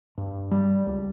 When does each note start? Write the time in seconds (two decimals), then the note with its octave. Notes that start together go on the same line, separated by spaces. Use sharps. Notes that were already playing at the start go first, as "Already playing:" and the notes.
0.18 G2
0.51 G3
0.87 C#2